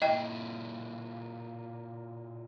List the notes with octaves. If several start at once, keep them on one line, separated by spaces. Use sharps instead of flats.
A#2 E4 D#5 G5